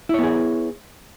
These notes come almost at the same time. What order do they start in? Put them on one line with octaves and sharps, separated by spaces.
E4 C#5 B3 G#4